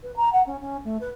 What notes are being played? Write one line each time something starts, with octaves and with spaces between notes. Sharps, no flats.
B4
A#5
F#5
C#4
C#4
A3
B4